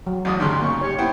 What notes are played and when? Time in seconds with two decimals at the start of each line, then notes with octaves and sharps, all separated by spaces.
0.07 F#3
0.25 A1 E2 F#4 D#6
0.40 D2 G2 C#3 D#4 C6
0.61 A#3 C#4 D#4 C#6
0.81 G4 C#5
0.98 B3 E4 C5 G5